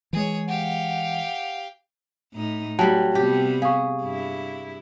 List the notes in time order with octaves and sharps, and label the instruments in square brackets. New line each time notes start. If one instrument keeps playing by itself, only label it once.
[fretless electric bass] E3 G#3 [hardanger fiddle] G#4 C#5
[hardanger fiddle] G4 F5 [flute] F#5
[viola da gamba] A2 D#4
[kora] F#3 G3 [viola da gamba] A3 [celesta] G5 A5
[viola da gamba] C3 G3 B3 [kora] G4
[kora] G#4 [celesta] F5 C#6
[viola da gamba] G2 E4